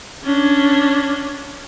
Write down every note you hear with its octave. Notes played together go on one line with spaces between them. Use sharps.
C#4 D4